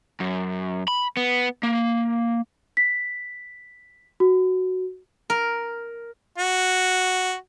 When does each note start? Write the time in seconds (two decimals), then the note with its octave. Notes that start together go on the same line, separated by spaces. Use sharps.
0.20 F#2
0.88 B5
1.17 B3
1.63 A#3
2.77 B6
4.20 F#4
5.30 A#4
6.38 F#4